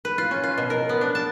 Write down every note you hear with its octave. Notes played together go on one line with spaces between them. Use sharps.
B4
F4
C#4
F4
B2
A#4
B3
D4
A5